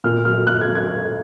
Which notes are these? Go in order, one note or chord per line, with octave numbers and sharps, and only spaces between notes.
A#2 F6
F#3 F6
A#2 F#6
G#6
F#3
G#6